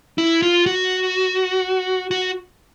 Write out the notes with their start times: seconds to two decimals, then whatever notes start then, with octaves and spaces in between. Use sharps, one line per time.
0.18 E4
0.42 F4
0.66 F#4
2.11 F#4